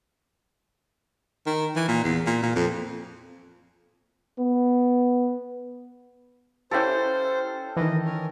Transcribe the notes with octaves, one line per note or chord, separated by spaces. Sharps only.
D#3
E3
A#2
E2
A#2
A#2
F2
B3
C#4 E4 G4 A4 C5 F5 G5
D#3 E3 D#5
C#4 A#4